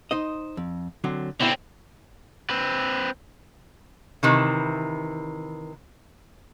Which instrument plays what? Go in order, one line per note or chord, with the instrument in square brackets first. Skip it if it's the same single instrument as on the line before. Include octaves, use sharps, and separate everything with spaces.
[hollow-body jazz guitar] D#4 C5 D#5
F2
D3 F#3 C4
[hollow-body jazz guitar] B2 E4 [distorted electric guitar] D3 C4
[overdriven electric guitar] C4 B4
[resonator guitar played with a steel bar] C3 D#3 E3